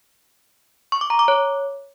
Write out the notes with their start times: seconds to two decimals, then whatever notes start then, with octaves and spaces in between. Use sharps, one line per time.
0.92 C#6
1.01 D6
1.10 A#5
1.19 D6
1.28 C#5